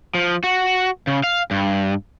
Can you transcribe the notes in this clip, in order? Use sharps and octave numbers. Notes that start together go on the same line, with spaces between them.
F3
F#4
C#3
F5
G2